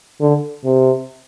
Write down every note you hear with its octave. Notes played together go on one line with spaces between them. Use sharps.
D3
C3